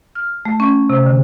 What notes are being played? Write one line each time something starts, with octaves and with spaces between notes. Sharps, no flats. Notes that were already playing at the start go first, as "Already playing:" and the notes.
F6
A3
C#4
C3
D3